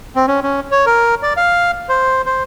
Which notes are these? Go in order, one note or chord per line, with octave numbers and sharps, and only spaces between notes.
C4
C#4
C#4
C#5
A#4
D5
F5
C5
C5